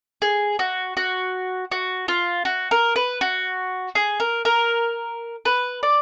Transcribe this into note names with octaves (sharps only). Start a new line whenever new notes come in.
G#4
F#4
F#4
F#4
F4
F#4
A#4
B4
F#4
G#4
A#4
A#4
B4
D5